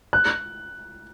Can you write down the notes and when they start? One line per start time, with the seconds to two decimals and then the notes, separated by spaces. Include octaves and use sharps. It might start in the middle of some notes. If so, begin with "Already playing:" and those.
0.13 F#6